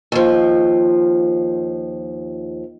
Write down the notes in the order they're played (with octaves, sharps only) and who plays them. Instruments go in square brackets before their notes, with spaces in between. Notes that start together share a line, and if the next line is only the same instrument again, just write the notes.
[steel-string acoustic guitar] D#2 F3